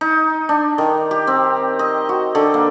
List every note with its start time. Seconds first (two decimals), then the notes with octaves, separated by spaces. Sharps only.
0.01 D#4
0.49 D4
0.78 D#3
1.11 G4
1.27 C4
1.79 D#5
2.09 F#4
2.35 D3
2.54 A#3